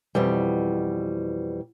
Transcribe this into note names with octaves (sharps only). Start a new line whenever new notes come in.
F2 B2 E3 G3